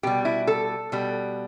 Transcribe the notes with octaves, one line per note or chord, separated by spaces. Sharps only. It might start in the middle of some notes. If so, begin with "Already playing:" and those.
B2 G3 G4
E4
A4
B2 G3